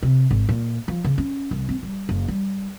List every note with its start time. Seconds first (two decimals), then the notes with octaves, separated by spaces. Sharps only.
0.03 C3
0.31 G#1
0.49 A#2
0.88 F3
1.04 C#3
1.18 C#4
1.51 C2
1.69 C4
1.83 G3
2.09 F#1
2.28 G3